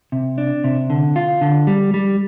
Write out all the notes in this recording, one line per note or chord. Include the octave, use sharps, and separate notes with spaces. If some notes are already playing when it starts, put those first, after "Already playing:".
C3
D4
C3
D3
F4
D3
G3
G3